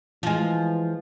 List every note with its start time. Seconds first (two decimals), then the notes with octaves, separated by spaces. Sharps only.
0.23 E3 F3 G#3